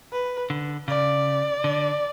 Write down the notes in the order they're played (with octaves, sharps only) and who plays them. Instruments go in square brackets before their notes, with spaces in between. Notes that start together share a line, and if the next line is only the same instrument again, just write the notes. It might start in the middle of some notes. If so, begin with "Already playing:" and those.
[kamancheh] B4
[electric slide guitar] D3
[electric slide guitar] C#3 [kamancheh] D5
[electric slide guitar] D3